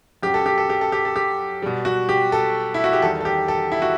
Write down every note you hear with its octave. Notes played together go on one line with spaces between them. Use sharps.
F#2 F#3 G4
A4
G4
A4
G4
A4
G4
A4
G4
B2 G3
F#4
G4
A4
E4
F#4
G4
E2 D#3 G3 A4
A4
G4
A4
E4
F#4